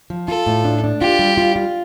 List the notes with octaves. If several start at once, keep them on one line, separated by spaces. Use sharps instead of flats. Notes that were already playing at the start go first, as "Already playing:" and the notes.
F3
F4 A4
A2
D4
D4
F4 G4
G3
F4
F4